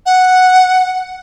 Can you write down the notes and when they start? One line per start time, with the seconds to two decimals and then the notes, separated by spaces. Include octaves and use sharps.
0.06 F#5